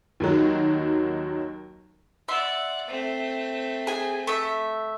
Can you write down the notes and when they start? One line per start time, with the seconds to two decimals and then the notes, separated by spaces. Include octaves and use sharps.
0.20 D#2 D#3 F#3
2.28 D5 E5 F#5 C6
2.87 A3 C4
3.87 G#4 G#5
4.27 A3 E5